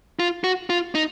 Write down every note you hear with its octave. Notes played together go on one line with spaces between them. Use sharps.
F4
F#4
F4
D#4